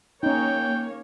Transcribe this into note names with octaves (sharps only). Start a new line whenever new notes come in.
A#3 C#4 D#4 C#5 G5